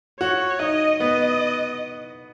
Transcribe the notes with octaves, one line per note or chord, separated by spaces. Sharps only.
F#4 C#5
D#4 D#5
B3 D#5